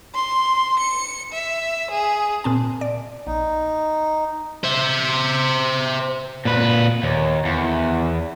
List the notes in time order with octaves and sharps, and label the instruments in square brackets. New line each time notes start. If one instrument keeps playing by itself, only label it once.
[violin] C6
C#7
E5
G#4
[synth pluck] A#2 C4 A5
D5
[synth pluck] A#1 [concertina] D#4
[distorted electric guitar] C5 E5
[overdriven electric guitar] A#2 B4
D#2
E2